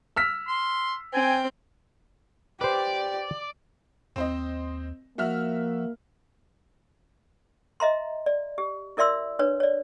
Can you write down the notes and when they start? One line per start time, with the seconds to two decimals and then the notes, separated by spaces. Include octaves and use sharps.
0.16 E6 F6 B6
0.48 C6
1.14 C4 G5 G#5
2.61 G4 B4 C5 D5
4.16 D#2 C4 C5 D#5
5.18 F3 A#3 F#4 E5 F6
7.80 D#5 E5 A#5 C6
8.26 D5
8.58 G4
8.97 E4 A#4 D5 E5 C6 E6
9.39 D4 B4 C#5
9.60 C#5 D5